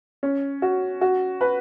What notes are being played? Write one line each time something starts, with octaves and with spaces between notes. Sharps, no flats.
C#4
F#4
F#4
B4